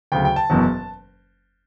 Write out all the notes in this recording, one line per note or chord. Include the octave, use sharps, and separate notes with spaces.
D2 C#3 F#3 G5
G5
A5
F#1 E2 B2 F#3